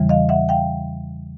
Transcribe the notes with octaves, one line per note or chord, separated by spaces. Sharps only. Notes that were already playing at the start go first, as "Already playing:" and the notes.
Already playing: E2 C#3 E3 G3
D#5 F5
E5 F#5
F5 G5